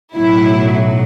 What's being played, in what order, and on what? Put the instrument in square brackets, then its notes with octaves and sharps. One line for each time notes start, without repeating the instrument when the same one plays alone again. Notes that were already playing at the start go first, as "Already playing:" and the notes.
[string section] B1 A2 F#3 E4